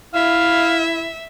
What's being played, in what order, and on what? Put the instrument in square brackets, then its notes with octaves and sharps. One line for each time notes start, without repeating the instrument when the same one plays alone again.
[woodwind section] E4 [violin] E5 [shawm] F5